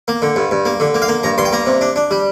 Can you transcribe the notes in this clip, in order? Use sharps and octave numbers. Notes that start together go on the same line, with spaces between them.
A#3
D3
G2
G2
A#3
D3
A#3
F5
A#3
G2 A#5
G2 C6
G5
A#3 A#5
C3
D4
D4
G3